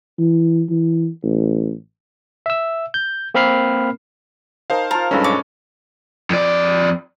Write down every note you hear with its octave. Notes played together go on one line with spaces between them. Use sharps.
E3
E3
A1
E5 E6
G6
A#3 C4 A#4 B5 F6 C7
D#4 A#4 C5 F5 A5
F4 A#4 A5
B1 G2 G#3 C#4 A4 B4 C5 F5
C#5 D6
F2 D5